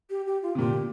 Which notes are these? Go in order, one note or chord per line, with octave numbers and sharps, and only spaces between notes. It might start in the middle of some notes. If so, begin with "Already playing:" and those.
G4
G4
F4
C3
A#2 G4